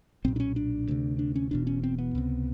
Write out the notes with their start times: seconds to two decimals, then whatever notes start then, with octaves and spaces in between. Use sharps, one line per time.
0.25 B1 A#2 C4
0.36 D4
0.40 C#4
0.56 D4
0.88 D2 C3
1.19 D4
1.36 C#4
1.51 E1 E2 B2 D4
1.67 C#4
1.83 C4
1.98 B3
2.15 C#2 C3